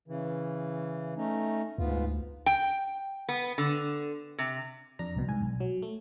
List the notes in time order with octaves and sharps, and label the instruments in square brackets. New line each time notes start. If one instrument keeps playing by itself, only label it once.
[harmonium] C#3 E3
A3 C#4 D#4
[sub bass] D2 [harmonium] G#2 B3 F4
[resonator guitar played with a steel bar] G5
B3
D3
C3
[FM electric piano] F2 D4 A#5
C2 B2
G#2 G#5
B1
F#3
A3